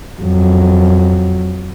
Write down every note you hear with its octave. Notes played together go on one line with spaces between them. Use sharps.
F2 F#3